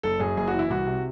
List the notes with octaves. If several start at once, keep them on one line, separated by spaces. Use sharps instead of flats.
F#1 A4
F#2 G#4
F#1 G#4
F#4
E3
E4
C2 F#4
C3